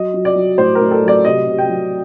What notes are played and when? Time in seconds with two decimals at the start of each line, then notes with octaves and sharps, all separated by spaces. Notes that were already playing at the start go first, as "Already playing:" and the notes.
Already playing: F#3 D#5
0.14 F#3
0.25 D5
0.36 F#3
0.58 A2 C5
0.75 A#4
0.81 A2
0.91 A4
1.02 F#3
1.08 D5
1.25 C3 D#5
1.47 C3
1.58 G5
1.69 F#3